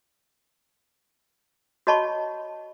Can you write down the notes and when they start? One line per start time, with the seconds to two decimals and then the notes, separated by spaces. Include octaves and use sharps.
1.87 F#4 C#5 D#5 A5 B5 C#6